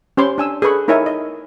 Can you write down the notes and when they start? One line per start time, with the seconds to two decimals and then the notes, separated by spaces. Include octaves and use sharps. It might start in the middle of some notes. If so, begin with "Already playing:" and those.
0.17 C#4 G4 C5 B5 C6 D6
0.38 D4 G#5 E6
0.62 G#4 A4 B4 B5 C#6
0.88 D#4 E4 A#4 C#5 E5 G#5
1.06 D#5